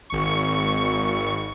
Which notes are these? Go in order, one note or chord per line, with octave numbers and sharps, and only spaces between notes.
G#1 C#6